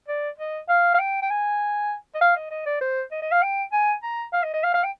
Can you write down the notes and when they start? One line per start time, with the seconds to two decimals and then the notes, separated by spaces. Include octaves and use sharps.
0.08 D5
0.38 D#5
0.69 F5
0.94 F5
0.99 G5
1.22 G5
1.30 G#5
2.15 D#5
2.21 F5
2.36 D#5
2.51 D#5
2.66 D5
2.81 C5
3.11 D#5
3.22 D#5
3.32 F5
3.42 G5
3.72 G#5
4.03 A#5
4.33 F5
4.43 D#5
4.54 D#5
4.64 F5
4.74 F5
4.84 G5